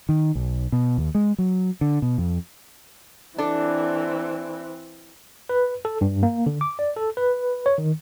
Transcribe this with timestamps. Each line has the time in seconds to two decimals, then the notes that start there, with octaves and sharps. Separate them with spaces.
0.09 D#3
0.35 B1
0.72 B2
0.98 D#2
1.15 G#3
1.38 F#3
1.81 D3
2.02 B2
2.18 F2
3.38 E3 C4 D4 A4
5.49 B4
5.85 A4
6.01 G2
6.23 A#3
6.46 D3
6.61 D6
6.79 D5
6.97 A4
7.17 B4
7.66 C#5
7.78 D#3